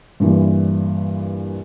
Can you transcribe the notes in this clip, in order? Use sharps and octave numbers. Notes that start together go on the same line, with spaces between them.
G2 A#2 E3